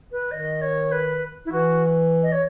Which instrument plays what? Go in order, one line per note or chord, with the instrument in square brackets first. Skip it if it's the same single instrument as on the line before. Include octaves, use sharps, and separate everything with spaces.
[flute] B4
[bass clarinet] D#3 [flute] D#5
[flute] C#5
B4
E4
[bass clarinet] E3 [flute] F#4
[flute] D#5
C#5